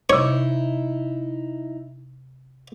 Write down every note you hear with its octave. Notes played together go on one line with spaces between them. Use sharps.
C3 D#4 E4 C#5 D6